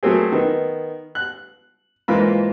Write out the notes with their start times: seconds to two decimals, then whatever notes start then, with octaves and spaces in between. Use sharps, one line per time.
0.03 F#3 A3 A#3 C4 G#4
0.32 D#3 B3
1.15 F#6
2.08 G#2 E3 A#3 F4 A#4 B5